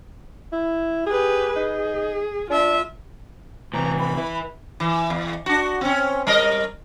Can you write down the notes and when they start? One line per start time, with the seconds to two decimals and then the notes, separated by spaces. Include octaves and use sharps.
0.53 E4
1.06 G4 G#4 B4
1.56 D#4 G#4
2.50 D4 F4 E5
3.74 A2 C3 E3 A#5
3.99 B5
4.17 E4 B4
4.80 E3
5.10 E2
5.46 D4 F#4
5.81 C4 C#4
6.27 G3 A#4 D#5